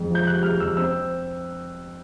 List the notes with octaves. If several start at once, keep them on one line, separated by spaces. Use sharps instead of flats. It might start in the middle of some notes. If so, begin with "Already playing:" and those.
Already playing: F2 G#3
F3 G6
C3 F#6
G#3 F6
F2 E6
C4 E6